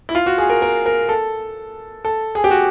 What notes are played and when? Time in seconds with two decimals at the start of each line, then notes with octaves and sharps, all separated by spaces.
0.09 E4
0.15 F4
0.26 F#4
0.38 G#4
0.50 A#4
0.62 A#4
0.86 A#4
1.09 A4
2.05 A4
2.35 G#4
2.44 G4
2.50 F#4